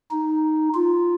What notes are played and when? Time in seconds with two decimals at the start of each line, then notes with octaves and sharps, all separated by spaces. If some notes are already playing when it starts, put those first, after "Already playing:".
0.11 D#4
0.75 F4